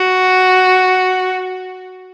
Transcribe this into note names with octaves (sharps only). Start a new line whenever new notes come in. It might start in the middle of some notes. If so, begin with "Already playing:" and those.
Already playing: F#4